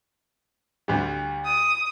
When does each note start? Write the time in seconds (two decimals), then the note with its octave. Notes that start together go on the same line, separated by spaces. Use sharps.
0.88 D2 G3
1.45 D#6